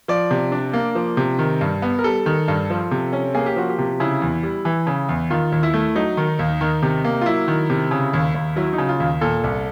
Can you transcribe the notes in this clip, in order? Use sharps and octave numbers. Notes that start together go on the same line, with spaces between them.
F3 D5
C3
D4
A#3
F3
C3
D#3
G2
B3
A#4
G3 A4
D#3
G2
F3
C3
C#4
A#3 G#4
G4
F3 F#4
G4
C3
C#3 E4
E2
G3
E3
C#3
E2
D#3 F4
D#2
E4
A3
F#3 D#4
D#3
D#2
D#3
C3
A#3
F4
F#3 E4
D#3
C3
C#3
D#2
D#2
F#3 E4
D#4
C#3
F4
D#2
A#2 A4
C2